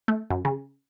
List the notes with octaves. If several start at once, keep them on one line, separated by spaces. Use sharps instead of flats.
A3
F#2
C#3